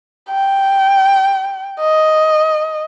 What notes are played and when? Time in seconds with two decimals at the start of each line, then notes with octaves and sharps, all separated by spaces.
0.30 G5
1.80 D#5